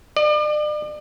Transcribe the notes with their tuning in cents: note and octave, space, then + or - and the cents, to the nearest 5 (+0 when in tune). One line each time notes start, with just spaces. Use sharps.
D5 +40